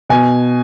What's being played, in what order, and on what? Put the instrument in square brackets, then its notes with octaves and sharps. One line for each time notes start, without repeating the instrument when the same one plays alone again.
[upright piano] B2 G#5